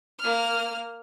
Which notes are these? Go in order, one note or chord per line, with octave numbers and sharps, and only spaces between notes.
A#3 F6